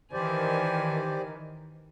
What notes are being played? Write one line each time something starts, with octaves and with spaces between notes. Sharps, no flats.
D#3 E3 G4 C5 D5 G#5